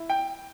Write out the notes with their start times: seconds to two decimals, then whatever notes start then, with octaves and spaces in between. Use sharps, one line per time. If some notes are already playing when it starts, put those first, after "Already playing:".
Already playing: E4
0.10 G5